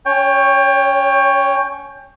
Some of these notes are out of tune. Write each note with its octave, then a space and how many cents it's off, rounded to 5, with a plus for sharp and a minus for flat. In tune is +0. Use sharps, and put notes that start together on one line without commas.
C#4 +30 C#5 +0 G5 +25